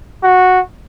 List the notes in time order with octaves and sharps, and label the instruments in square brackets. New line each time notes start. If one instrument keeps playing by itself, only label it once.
[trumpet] F#4